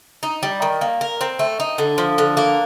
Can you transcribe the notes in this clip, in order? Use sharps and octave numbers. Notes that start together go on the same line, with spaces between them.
D#4
G3
D#3
A#3
A#4
C4
A3
D#4
D3
F3
D3
A#3